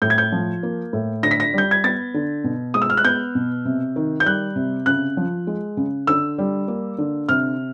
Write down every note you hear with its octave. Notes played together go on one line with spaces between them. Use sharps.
A2 G6
G#6
G6
F3
A#3
A2
D3 A#6
B6
A#6
G3 G6
G#6
B3 A6
D3
B2
G#3 D#6
E6
F6
F#6
B3 G6
B2
C3
D#3
G6
G3 F#6
C3
C#3 F#6
F3
G#3
C#3
D3 E6
G3
A#3
D3
C3 F6